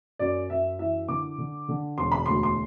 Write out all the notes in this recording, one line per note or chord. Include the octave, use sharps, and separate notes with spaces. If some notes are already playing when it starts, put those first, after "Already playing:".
F#2 D5
F#2 E5
E3 E5
D3 D6
D3
D3
E1 C6
B5
D2 C6
C6